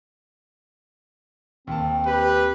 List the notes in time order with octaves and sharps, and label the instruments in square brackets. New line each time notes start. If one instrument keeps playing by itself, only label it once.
[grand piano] D#2 A5 [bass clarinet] C4
[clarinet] G4 [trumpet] B4